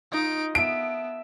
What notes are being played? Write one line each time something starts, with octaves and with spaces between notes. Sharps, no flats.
D#4 F4 D#5 D7
B3 E5 A5 D7